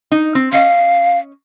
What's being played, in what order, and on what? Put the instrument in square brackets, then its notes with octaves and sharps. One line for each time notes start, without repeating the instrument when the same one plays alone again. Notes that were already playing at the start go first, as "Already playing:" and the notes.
[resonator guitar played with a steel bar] D#4
C4
[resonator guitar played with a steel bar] C#4 D#5 [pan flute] F5